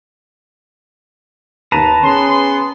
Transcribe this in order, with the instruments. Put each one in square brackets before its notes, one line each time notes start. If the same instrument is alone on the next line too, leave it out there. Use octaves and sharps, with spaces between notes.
[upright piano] D#2 D#7 [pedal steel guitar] B4 A5 A#5
[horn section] B3 G#4 C6 [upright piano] C#4